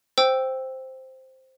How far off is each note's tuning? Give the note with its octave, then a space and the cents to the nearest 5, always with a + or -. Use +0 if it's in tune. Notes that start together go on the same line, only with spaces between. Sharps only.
C5 +0 G5 +0 E6 +0